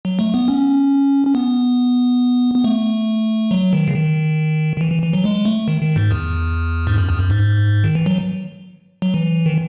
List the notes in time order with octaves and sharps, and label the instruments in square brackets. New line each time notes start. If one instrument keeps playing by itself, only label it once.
[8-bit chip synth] F#3
A3
B3
C#4
C#4
B3
B3
A3
F#3
D#3
C#3
D#3
D#3
E3
E3
E3
F#3
G#3
A3
D#3
D#3
G#2
E2
G#2
F#2
E2
F#2
G#2
D#3
E3
F#3
F#3
E3
D#3